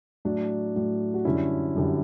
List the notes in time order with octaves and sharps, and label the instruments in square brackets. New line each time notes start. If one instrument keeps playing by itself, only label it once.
[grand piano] A2 F#3 D4
A2 F#3
F#4
F#2 D3 G3 C#4 E4
F#2 D3 G3